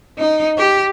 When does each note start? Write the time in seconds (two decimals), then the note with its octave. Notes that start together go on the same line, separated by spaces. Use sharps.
0.19 D#4
0.58 G4